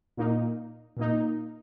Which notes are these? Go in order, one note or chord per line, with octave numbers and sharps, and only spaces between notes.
A#2 A#3 D#4
A#2 A#3 D#4